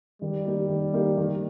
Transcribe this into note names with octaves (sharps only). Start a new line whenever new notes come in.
D#3 G3
A#3 D#4 G4
D#3
A#3 D#4 G4
D#3